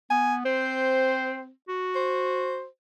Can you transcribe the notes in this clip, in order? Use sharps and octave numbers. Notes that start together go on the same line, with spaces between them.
B3 G#5
C4 C5
F#4
C5